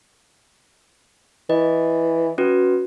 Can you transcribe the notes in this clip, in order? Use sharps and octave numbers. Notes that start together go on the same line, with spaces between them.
E3 D#5
C#4 F#4 B4